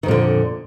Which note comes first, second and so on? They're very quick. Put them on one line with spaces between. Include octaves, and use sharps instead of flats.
D#3 F2 A#2 D3